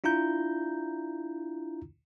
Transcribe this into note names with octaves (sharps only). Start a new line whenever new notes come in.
D4 E4 F4 A#5 G6